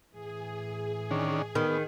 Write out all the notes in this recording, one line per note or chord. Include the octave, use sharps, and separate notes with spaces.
A2 E3 G#4
D#3 C#4 D4
D#3 B3